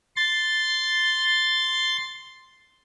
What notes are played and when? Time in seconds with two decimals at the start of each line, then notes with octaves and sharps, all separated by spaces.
0.16 C6 A6